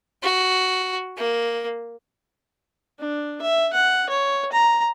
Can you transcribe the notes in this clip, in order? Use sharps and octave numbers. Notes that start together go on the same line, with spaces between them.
F#4
A#3
D4
E5
F#5
C#5
A#5